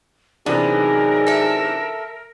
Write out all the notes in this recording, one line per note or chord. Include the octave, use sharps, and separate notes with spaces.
C3 E3 F#3 B3 D4 D#4 G#4 A#4
A4 E5